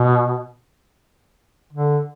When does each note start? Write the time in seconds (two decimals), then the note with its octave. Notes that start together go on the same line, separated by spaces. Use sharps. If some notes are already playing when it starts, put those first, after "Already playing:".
Already playing: B2
1.73 D3